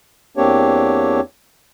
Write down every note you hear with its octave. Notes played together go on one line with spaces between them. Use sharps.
E2 A#3 C4 D4 G4 C#5